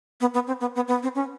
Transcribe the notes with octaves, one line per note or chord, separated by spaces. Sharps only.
B3
B3
C4
B3
B3
B3
C4
C#4